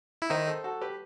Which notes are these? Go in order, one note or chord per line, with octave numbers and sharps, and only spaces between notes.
E4
D#3 D#4 C5 E5
A4 C5
F#4 A4
G4 B4